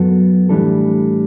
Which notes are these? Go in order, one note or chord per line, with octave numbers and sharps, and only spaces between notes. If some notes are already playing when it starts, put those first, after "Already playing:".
Already playing: F#2 F#3 B3 F#4 A4
A2 E3 G3 D4 A4